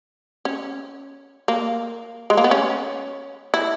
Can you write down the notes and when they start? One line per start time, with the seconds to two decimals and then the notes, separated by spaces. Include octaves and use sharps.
0.45 C#4
1.48 A#3
2.30 G#3
2.37 A#3
2.44 B3
2.51 C#4
3.54 E4